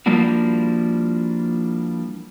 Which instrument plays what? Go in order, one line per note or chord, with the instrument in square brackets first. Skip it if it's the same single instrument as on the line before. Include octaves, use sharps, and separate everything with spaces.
[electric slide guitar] F3 G3 A#3 D4 E4 F#4